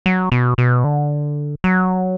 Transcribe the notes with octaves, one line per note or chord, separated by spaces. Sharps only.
F#3
B2
B2
D3
F#3